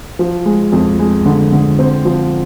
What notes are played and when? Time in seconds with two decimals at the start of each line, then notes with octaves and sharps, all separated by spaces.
0.19 F3
0.46 G#3
0.72 F2
0.99 G#3
1.26 D3
1.52 D3
1.79 C4
2.05 F3